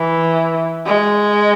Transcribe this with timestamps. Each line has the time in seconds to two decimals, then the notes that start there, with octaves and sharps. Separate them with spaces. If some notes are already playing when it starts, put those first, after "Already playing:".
Already playing: E3
0.86 G#3